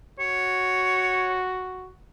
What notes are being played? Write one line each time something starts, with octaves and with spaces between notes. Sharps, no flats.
F#4 C#5